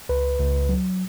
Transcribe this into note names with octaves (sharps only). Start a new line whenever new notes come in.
C#2 B4
C#2
F#3